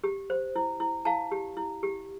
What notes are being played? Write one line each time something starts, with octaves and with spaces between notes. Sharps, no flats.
G4
C5
E4
E4
E4 F5 A5
G4
E4
G4